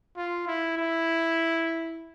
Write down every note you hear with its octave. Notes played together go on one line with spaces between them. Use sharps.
F4
E4
E4